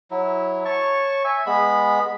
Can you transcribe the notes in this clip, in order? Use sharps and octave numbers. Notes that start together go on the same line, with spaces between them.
F#3 E4
C#5 A5 C#6
E5 G#5
G#3 B3 B5